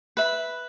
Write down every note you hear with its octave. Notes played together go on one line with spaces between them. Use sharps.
B4 E5 B5